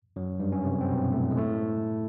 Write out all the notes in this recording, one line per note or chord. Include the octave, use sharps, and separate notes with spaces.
F#2 F#3
G2 G3
C#4
C3 C4
C4
B2 B3
A2 A3
G#3
A2 A3